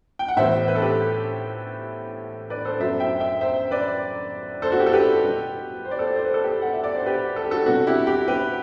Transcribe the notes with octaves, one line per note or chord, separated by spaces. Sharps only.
G5
F#5
A2 E3 G3 B3 C5 E5
B4
A4
G4 B4
B4 D5
A4 C5
F#2 F#3 B3 C5 E5
E5 G5
E5 G5
C5 E5
B4 D5
A4 C5
F#4
G4
A4
G4 B4
B2 G3 B3
C5
D5
A4 C5
C5
B4
A4
G4 B4
F#5
E5
D5
C5
G4 B4
A4
G4
F#4 A4
C3 G3 B3 F#4
E4 G4
E4 G4
G4 B4